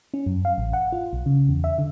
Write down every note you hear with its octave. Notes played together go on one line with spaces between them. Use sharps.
C#4
F#2
F5
A1
F#5
F4
B1
C#3
E2
E5
D3